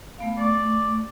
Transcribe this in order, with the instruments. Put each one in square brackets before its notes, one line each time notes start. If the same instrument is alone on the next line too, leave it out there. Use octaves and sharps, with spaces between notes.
[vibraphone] A3 B3 F5
[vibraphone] A3 C#6 [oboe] D5